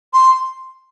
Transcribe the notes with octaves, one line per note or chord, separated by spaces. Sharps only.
C6